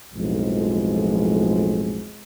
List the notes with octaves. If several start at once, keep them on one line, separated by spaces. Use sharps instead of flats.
B1 F2 A2 F3 G#3